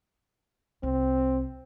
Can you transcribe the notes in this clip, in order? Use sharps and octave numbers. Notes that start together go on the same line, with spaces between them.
C2 C4